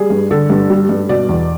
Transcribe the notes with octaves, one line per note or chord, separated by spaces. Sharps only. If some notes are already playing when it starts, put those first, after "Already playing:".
Already playing: G3 G#4
G2
D3 A4
G2
G3
G2
B2 D5
E2